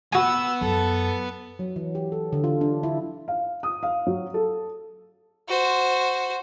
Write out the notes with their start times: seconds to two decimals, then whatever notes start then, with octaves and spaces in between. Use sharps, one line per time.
0.13 B3 F#4 B4 G#5 E6
0.61 F#2 A4
1.59 F#3
1.76 E3
1.95 G4
2.12 A4
2.33 D3
2.44 F4
2.61 D4
2.83 E4
3.28 F5
3.63 D#6
3.83 F5
4.07 F#3
4.34 A4
5.48 F#4 C5